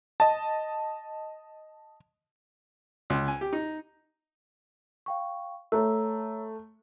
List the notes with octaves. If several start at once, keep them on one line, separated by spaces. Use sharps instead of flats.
D#5 A5
C#2
G#5
G4
D#4
F5 G5 C#6
A3 C#5 A#5 E6